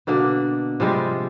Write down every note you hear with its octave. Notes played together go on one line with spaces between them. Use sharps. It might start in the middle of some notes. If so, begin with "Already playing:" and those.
B2 D3 A#3 D4
C3 F3 G3 G#3